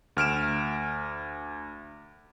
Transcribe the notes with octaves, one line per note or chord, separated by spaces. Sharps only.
D2 F6 D7 E7